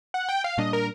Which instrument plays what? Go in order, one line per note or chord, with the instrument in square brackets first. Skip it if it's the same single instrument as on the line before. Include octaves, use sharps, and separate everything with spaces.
[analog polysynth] F#5
G5
F5
[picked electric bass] A#2 G3 A#3 D4 [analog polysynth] D#5
[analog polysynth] A#4